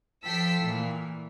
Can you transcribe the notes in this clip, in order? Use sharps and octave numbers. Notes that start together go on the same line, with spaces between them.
F3 A4 G5 E6 B6 C7
A#2 E3